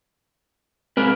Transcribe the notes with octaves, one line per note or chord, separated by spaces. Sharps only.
G#3 C4 A#4 B4